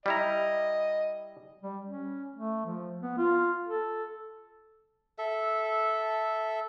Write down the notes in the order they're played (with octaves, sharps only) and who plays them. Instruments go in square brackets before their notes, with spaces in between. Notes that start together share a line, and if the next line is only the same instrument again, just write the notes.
[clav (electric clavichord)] G3 E4 A#5 [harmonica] D#5
[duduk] G3
C#4
A3
F3
B3
F4
A4
[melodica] A4 E5